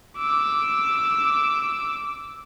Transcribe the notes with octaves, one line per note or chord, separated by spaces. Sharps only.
D6 E6